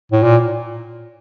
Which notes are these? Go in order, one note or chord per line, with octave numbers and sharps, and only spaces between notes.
A2
A#2